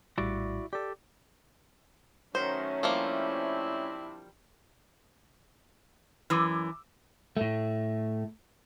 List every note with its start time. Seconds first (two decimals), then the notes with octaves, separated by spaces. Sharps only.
0.18 A#1 A2 G3 E4 F#4 D5
0.73 G4 A4 D5
2.35 D#3 F#3 A3 C#4 C5
2.83 F3 G3 A#3 C4 D4 E4
6.30 F#2 E3 D6 E6
7.37 A2 A3